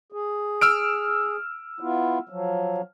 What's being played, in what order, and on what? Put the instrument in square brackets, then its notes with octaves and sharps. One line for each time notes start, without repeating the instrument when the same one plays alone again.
[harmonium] G#4
[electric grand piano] E6 F6 D7
[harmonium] B3 E4 F4
F3 F#3